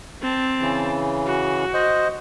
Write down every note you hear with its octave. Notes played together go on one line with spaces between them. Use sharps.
C4 A5
C#3 E3
F#4
C5 D#5